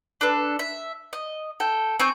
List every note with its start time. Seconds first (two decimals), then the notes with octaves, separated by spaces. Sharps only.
0.21 D4 A4 B4
0.59 E5
1.13 D#5
1.60 A4 G5
2.00 C4 G#5 C#6 G6